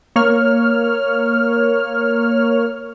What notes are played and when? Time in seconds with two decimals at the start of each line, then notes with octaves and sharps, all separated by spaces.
0.16 A#3 C#5 F6